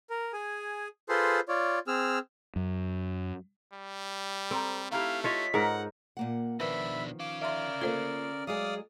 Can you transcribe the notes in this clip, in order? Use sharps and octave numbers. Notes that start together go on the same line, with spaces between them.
A#4
G#4 G#5
F4 G#4 A4 B4 C5 C6
F4 C#5 D5
C4 G#4 E6 F6
F#2
G3
C4 A4 A#5
A3 D#4 E4 G4 F5
F4 C#5 D#5 B6
G#2 D#4 F4 A4 A#4 F#5
A#2 A#3 F#5
B2 D#3 F3 D4 B4 E5 B5
C#4 F5 D6
A#4 D5 E5 C6
A#3 F4 A4 C5
F#3 G#3 G#4 D5 F5 D#6